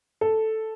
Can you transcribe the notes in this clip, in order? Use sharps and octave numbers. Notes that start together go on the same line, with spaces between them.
A4